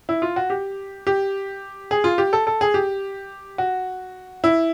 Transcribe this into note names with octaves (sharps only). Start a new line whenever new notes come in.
E4
F4
F#4
G4
G4
G#4
F4
G4
A4
A4
G#4
G4
F#4
E4